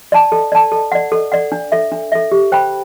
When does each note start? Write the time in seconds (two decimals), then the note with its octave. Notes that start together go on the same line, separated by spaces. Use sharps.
0.12 D5 A5
0.32 A4
0.52 D5 A5
0.72 A4
0.92 D5 F#5
1.12 A4
1.32 D5 F#5
1.52 D4
1.72 A4 E5
1.92 D4
2.12 A4 E5
2.32 G4
2.52 C5 G5 B5